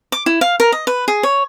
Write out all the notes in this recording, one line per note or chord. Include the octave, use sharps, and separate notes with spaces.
D6
E4
F5
A#4
D#5
B4
G#4
C#5